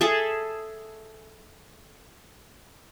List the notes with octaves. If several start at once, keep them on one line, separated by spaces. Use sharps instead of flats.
G#4 A4 E5 A5